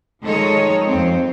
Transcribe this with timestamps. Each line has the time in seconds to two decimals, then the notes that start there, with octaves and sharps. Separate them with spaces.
0.22 D#3 F3 G#3 A4 C#5 D#5
0.88 F2 C4